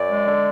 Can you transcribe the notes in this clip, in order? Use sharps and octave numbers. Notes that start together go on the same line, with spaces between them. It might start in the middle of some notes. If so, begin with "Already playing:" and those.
Already playing: F#2 D5
G#3
D3